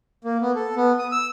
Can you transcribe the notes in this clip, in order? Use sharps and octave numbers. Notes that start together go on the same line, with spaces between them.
A#3
B3
A4
B3
D#6
E6